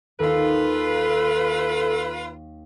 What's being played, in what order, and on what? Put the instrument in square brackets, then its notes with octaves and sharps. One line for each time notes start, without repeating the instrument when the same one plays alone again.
[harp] D#2 D#4 [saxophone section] F4 B4 [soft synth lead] A4